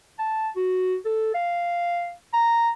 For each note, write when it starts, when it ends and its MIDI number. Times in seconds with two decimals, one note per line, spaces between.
0.19 0.49 81
0.56 0.96 66
1.05 1.34 69
1.35 2.13 77
2.33 2.69 82